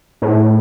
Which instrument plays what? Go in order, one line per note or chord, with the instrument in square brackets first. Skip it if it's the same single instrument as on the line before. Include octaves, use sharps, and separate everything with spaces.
[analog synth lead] A2